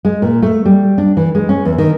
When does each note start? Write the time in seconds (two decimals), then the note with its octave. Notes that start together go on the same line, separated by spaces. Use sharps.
0.05 G#3
0.22 A#2
0.42 A3
0.65 G3
0.98 D4
1.17 E3
1.35 G#3
1.49 C#4
1.65 E2
1.78 D#3